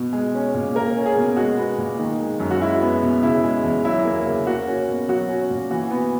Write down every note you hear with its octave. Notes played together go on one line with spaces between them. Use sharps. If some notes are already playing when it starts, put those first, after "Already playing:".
Already playing: B2
G#3
C#4
A#2
A#3 A#4
C#4
G#4
B2
G#3 F#4
B3
A#2
D#3
G#3
F#2
F#4
G#3 E4
B3
B2
C#3 E4
G#3
E2
F#3 E4
A#3
C#3
A#3 F#4
C#4
B2
F#3 F#4
C#4
A#2
E3 F#4
B3